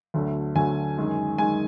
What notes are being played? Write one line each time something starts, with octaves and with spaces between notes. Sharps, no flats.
D2 D3 F#3 A3
D2 D3 F#3 A3 G#5
F#2 D#3 G#3
D#3 G#3 G#5